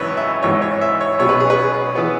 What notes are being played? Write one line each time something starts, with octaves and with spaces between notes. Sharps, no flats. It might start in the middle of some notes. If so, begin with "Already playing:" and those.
Already playing: G#1 F#2 C#3 E3 B4 C#5
E5
G#1 G#2 E3 B3 C#5
C#5
E5
C#5
B1 B2 F#3 C#4 C#5
B4
G#4
B4
E3 B3